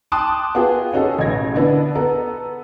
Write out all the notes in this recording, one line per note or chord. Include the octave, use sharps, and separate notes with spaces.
G5 A5 C6 D6 D#6 F#6
B3 F4 F#4 G#4 G5
C#4 D#4 F#4 G#4 A4 B4
A1 B2 G#6 A#6
D3 B3 D4 E4
B3 A4 A#5